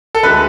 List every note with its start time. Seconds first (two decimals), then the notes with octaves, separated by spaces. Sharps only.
0.15 A4
0.23 D2 D3 G#3 B4